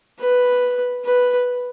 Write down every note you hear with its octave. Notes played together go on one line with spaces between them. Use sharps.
B4
B4